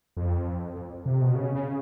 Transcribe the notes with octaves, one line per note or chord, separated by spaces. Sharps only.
F2
F2
C3
B2
C#3
C#3